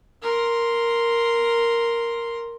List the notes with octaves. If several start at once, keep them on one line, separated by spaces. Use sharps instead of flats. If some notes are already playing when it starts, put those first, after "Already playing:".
A#4 C6